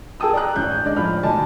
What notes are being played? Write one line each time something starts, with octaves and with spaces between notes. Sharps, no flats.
G#4 A#4 G5 A5 D#6 E6
D5 A#5 F#6
A1 G6
D3 G#3 D5
A2 F3 B5 F6
D#2 B2 D#4 D5 G#5 A5